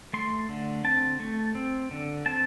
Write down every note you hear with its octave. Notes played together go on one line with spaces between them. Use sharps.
A3 C6
D3
C4 A5
A3
C4
D3
C4 A5